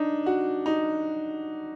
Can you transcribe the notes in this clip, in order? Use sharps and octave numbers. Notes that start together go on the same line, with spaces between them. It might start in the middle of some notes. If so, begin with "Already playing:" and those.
Already playing: D4 D#4
F#4
D#4